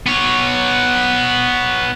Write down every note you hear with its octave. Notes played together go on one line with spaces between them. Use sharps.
B3 C#5